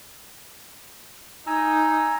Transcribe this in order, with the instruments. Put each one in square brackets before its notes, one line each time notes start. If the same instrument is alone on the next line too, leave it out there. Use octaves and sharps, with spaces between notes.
[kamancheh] D#4 [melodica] G#5 A#5 E6